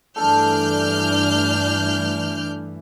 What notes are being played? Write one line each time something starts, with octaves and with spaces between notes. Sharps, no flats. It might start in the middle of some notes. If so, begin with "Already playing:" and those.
G2 E3 A3 D4 A4 A5 F6 G6